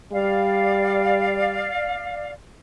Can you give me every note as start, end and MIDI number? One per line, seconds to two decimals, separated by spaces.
0.13 1.73 55
0.13 2.32 74
0.13 2.32 77